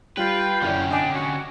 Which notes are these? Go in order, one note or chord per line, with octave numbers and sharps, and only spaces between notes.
G3 F4 B4 G5
F#1 D3 C#4 E4 D5
D4 D#5 G#5
F#4